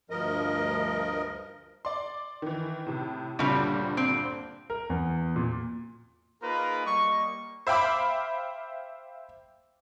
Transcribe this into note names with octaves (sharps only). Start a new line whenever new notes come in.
D2 G2 F3 A#4 D#5
D5 C6
D#3 E3
A2 C3
D2 G2 A#2 C#3 G3 C4
C4
A#4
E2
A#2
A#3 D#4 F4 G#4 A#4 B4
G3 A#3 D#5 C#6
C5 E5 F5 G5 B5 D6